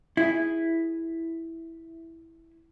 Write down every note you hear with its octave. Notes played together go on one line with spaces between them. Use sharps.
E4 G#4